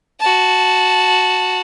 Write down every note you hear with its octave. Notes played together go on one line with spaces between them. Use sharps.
F#4 A5